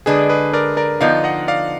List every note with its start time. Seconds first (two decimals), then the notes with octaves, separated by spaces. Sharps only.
0.06 D3 G#3 D4 G#4 B4
0.29 G#4 B4
0.53 A#4 D5
0.77 A#4 D5
1.01 D3 F3 B3 D#4 D5 F5
1.24 D#5 F#5
1.48 D5 F5